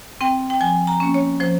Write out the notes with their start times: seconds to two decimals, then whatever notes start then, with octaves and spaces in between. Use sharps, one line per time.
0.21 C4 G5
0.50 G5
0.61 F3 G#5
0.87 A#5
1.00 A#3 C#4
1.14 C#5
1.40 F3 C5